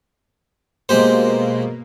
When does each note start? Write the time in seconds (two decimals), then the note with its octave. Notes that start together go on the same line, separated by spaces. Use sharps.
0.89 B2 G#3 A#3 G4 C5